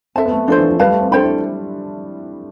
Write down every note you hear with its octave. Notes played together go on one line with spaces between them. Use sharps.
C4 A4 E5 A5
B3
A3
F3 D4 A4 C5
E3
F3
G3 B4 F5 A5
A3
C4
D4 A4 C5 G5 B5
E4